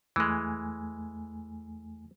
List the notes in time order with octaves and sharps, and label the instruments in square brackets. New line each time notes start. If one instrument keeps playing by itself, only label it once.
[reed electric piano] E2 A3 G#5 [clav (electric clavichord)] E3 G#3